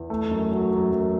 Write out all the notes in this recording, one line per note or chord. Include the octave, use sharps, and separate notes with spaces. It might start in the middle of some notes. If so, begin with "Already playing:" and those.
Already playing: E2
A3
F#2
F#3
F#2
F#2